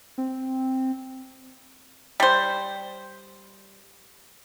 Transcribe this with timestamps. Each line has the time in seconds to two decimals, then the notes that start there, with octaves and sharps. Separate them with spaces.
0.18 C4
2.20 G3 C5